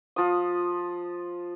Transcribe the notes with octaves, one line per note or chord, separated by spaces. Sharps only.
F3 D#6